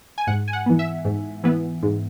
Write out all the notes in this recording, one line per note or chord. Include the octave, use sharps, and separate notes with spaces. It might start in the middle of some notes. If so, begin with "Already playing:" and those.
G#5
G#2 F#5
G#5
F#5
E3 B3
E5
G#2
E3 B3
G#2